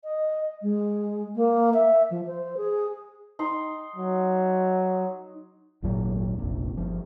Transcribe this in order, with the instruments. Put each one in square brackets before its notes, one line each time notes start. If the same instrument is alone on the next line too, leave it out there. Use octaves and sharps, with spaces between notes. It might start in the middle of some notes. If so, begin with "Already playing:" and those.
[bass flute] D#5
G#3
A#3
E5
F3
C5
G#4
[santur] D#4 C6
[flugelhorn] F#3
[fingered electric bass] G#1 D#2 A#2 F#3
F1 A#1 C3
G1 F3